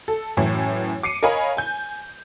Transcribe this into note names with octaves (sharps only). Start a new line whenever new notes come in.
A4
F#2 A2 E3
D6 C7 C#7 D#7
A#4 C#5 D#5 F5 G#5 B5
G#5 G6